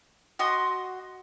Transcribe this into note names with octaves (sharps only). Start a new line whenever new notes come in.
F#4 D#5 C6 D#6